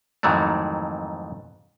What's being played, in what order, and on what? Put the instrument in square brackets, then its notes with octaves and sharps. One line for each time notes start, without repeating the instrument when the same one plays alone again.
[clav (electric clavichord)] F2 G#2 D#3 E3 F#3 A3